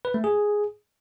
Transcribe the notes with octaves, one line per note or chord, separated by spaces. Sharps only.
B4
A3
G#4